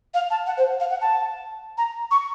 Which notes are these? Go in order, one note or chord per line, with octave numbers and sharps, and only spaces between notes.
F5
A5
F#5
C5
F5
F#5
A5
A#5
C#6